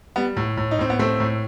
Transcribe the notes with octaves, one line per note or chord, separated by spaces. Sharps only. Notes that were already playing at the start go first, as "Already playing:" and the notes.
G3 B3
A2
A2
D#4
A2 C4
B3
A2 A3 C4
A2